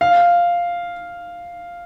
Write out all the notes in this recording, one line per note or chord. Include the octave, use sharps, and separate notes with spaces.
F5